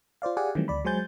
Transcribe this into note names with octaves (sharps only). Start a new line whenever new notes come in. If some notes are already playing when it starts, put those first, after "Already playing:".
F4 C5 D5 F5
G4 G#4 D5 F5 F#5 G#5
D#3 E3 F#3 G3 A3 C4
D2 D5 B5
F#3 G#3 C5 G#5 G6 A6